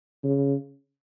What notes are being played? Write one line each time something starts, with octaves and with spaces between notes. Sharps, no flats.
C#3